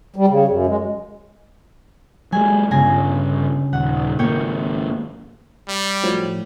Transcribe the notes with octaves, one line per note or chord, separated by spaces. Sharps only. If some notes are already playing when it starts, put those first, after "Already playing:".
G3
C#3
F#2
G#3
F#3 G#3 G#5
G1 C#3 G#5 A#6
D#1 F#5
G#1 A#3 C#5 G5
G3
A2 F3 F#3